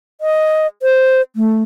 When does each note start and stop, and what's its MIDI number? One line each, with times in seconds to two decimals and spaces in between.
0.21 0.67 75
0.82 1.21 72
1.36 1.63 57